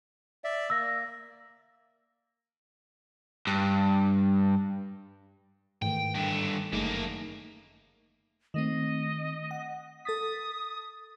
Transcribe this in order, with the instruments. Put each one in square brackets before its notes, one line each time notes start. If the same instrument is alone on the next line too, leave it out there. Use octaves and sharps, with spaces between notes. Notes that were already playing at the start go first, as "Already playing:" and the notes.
[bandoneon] D5 E5
[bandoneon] A#3 [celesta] E6 A#6
[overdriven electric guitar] G2
[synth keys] G#2 [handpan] D#3 E3 A3 [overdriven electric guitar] G5
[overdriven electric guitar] G2 D3
[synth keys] G1 [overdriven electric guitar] F#2 A#3 [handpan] A3 D#4 G#4
[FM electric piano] D#3 A3 C4 [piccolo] D#5
[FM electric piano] F#5
[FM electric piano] A4 A6 B6 [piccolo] D#6